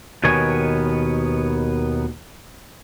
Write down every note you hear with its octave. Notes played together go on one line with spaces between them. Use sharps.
D#2 B2 D#3 B3 C#5 G#5